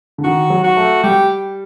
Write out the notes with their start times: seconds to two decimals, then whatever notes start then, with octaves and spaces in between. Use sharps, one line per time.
0.18 D3
0.24 D#3 F#4
0.50 F#3
0.64 F#4
0.77 A3
1.04 G3 G4